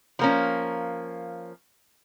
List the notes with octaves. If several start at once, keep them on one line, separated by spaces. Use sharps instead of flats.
F3 A#3 C#4